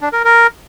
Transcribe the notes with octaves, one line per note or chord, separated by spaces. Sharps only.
D4
A#4
A#4